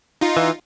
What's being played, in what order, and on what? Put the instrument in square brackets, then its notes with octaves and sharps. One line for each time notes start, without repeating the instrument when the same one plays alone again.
[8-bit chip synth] D#4 F4
[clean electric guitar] E3